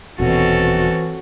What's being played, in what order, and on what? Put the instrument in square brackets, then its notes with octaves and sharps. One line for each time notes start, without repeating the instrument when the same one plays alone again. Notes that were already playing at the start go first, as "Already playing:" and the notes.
[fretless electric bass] D#1 B2 [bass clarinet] E3 [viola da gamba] C4 C#4 A4 [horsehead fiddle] F#4